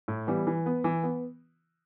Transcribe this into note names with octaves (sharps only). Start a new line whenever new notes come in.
A2
E3 G3 B3
E3
B3
E3
B3